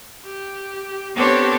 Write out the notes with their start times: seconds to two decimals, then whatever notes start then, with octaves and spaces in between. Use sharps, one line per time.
0.24 G4
1.15 B3 C4 D4 G4 A4 C#5